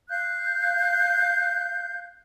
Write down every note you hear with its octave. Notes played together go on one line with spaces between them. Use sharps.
F5 F#6 G6